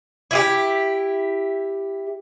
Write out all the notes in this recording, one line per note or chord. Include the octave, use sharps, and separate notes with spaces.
E4 F4 G4